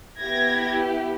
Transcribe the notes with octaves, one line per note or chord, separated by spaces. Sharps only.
B3 E4 G4 G#6 A#6